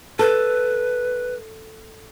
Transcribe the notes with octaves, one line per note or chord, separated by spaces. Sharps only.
A4 B4